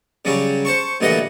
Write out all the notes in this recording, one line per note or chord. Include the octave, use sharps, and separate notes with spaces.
C#3 F#3 G3 C#4
C5 A5 C#6
D2 A#2 E3 G3 D#5 F#5